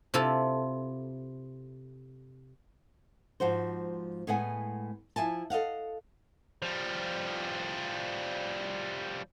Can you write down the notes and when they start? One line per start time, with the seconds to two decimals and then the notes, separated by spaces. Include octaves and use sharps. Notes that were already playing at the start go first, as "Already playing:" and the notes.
0.14 C3 E4 F4 A4
3.40 G#2 F3 F#4 C5
4.27 A2 G#3 B3 F#5 G#5
5.16 F3 E4 G#5 A5
5.50 A4 D#5 F5 F#5
6.62 F3 G3